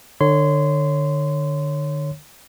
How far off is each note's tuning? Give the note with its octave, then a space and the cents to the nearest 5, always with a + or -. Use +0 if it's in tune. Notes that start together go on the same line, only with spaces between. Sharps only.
D3 +35 C#5 +0 C6 -25